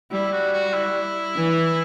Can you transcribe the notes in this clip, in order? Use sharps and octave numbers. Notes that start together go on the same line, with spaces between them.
G3 E4
F#4
F#4
E4
E3